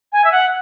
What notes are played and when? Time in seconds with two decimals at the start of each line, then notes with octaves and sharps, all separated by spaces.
0.13 G#5
0.24 E5
0.32 F#5